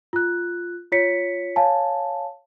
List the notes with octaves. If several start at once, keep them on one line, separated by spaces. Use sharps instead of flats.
F4 F#6
F4 C#5 B6 C#7
C#5 F5 G#5 A5